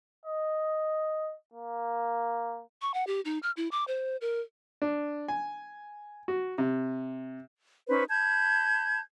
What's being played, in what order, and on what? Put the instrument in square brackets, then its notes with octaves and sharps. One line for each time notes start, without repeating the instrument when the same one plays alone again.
[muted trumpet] D#5
A#3
[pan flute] C#6
F#5
G4
D#4
F6
E4
D6
C5
A#4
[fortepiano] D4
G#5
F#4
C3
[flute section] C#4 D#4 B4 C5
A5 B5 G6 G#6